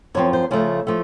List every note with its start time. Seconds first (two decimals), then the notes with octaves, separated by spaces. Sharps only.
0.15 F#2 F3 C4 C#5
0.33 C5
0.51 C#3 F3 A3 C#5
0.87 F3 A3